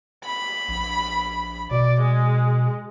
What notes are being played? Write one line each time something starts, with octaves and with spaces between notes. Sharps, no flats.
B5
A#1
B2 D5
G#3